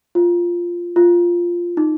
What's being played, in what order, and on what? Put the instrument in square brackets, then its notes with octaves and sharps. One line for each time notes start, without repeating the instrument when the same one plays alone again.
[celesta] F4
F4
D#4